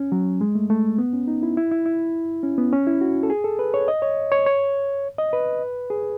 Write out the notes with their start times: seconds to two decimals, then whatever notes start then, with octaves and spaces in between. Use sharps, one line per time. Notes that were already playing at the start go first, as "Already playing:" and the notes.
Already playing: C#4
0.12 F#3
0.41 G#3
0.55 A3
0.70 A3
0.98 B3
1.13 C#4
1.27 D#4
1.43 E4
1.57 E4
1.71 E4
1.86 E4
2.43 C#4
2.58 B3
2.73 C#4
2.87 E4
3.01 F#4
3.23 A4
3.30 G#4
3.44 A4
3.59 B4
3.74 C#5
3.88 D#5
4.02 C#5
4.32 C#5
4.46 C#5
5.18 D#5
5.33 B4
5.90 G#4